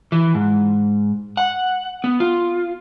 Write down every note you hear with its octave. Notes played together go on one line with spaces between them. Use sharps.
E3
G#2
F#5
B3
F4